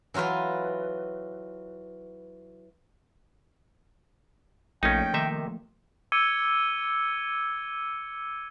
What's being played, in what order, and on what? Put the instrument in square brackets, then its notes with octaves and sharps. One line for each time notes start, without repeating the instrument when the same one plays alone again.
[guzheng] E3 F#3 F4 F#4 B4
[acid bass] A#1 [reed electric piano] F3 A3 A#3 [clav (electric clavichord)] C#4 D#4 [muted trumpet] G5
[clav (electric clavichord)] C3 D#4 E5 [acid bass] D#3
[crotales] D6 E6 G#6 C#7 D#7 G7